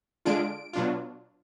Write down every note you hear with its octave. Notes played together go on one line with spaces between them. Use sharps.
D3 G#3 D4 F4 D7
B2 F#3 D4 F4